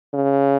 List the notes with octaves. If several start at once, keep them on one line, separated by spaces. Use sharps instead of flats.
C#3